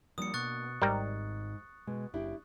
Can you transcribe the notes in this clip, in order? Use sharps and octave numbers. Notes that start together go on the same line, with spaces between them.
F3 G3 A#3 D4 D#6 C#7
B2 C#6 F#6 A6
G#1 G#2 G3 A#4 G5
B2 G#3
F#1 D4 E4 G4